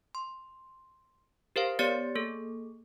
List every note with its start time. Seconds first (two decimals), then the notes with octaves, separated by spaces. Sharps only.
0.15 C6
1.56 G4 A#4 C5 F5
1.79 B3 G4 C#5 D5 A6 C#7
2.15 A#3 G#4 A4